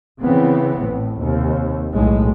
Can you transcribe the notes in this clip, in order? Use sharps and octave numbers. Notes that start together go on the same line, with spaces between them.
C#3 E3 B3 C4
A1 A2
D#2 C3
B1 A2 G#3